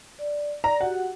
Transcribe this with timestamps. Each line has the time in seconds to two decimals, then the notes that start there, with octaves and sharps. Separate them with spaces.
0.19 D5
0.64 D5 A#5
0.81 F#4 G4 F#5